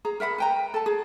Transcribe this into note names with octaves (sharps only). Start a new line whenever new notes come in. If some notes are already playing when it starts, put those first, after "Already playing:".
G#4 A#5
A#4 E5 F#5 B5
B4 G5 A#5
A4 A5
G#4